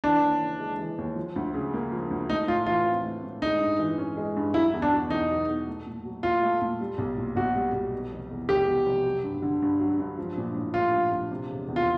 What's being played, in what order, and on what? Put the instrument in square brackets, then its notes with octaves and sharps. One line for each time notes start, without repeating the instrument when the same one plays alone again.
[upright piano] E3 [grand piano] D4
[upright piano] D#2
C#3
G#3
E3
D#2
F3
D2
C#3
A#3
F3
D2
[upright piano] A3 [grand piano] D#4
[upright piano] A2 [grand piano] F4
[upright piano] E3 [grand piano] F4
[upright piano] C4
A3
A2
[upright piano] G#3 [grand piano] D#4
[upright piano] G2
E3
C#4
G#3
G2
[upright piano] F#3 [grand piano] E4
[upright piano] E2
[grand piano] D4
[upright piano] B2
[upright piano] E2 [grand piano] D#4
[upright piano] F#3
E2
A3
A#2
F#3
[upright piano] A#2 [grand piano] F4
[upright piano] A3
A#2
G3
B1
A#2
[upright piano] B1 [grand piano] F#4
[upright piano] G3
B1
B2
F1
E2
[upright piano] F1 [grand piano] G4
[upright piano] B2
F1
F#3
G2
D3
G2
F#3
G2
F3
A#1
A2
[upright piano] A3 [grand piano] F4
[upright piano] F3
A#1
C3
E1
E2
[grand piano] F4